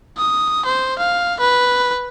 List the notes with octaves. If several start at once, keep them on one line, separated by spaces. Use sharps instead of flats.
D#6
C5
F5
B4